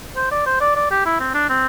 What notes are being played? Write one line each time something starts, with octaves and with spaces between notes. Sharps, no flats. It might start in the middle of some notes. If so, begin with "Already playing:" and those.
C5
D5
C5
D5
D5
G4
E4
C4
D4
C4